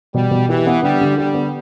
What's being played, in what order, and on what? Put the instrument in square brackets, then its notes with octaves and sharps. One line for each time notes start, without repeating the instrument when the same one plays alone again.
[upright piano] B2 [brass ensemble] G3
[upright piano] B2
[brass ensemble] E3 [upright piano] G4
[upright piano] B3
[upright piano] D3 [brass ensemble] G3
[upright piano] D3
[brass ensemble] G3 [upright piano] G4
[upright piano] B3